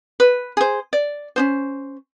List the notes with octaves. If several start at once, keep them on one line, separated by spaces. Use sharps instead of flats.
B4
G#4 C5
D5
C#4 D4 C5